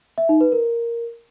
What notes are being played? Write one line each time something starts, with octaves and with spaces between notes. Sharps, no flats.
E5
D#4
B4
A#4